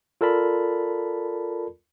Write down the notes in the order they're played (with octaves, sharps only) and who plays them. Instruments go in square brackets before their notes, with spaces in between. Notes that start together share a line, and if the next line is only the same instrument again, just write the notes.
[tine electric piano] F4 A4 A#4 D5 A5 B5